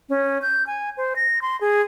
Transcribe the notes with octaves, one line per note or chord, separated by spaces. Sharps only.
C#4
G6
G#5
C5
A#6
C6
G#4